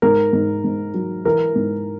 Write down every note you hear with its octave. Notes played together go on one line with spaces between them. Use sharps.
G#2 A#4
G#2
G#2
F#3
E3 A#4
G#2